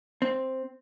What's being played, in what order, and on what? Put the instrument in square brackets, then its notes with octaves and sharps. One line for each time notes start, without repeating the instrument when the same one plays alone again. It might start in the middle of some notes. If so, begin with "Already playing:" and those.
[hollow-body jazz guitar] C4